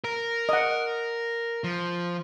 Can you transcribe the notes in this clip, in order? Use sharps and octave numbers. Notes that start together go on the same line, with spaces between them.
A#4
D#5 F#5
F3